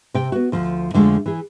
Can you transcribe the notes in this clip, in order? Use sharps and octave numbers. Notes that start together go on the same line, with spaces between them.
C3 G5
B3 F#4
D2 F3
F2 D3 F3 G#3 A3
E3 G#4